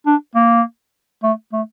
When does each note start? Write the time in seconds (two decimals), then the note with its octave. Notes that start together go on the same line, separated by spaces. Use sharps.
0.06 D4
0.35 A#3
1.23 A3
1.53 A3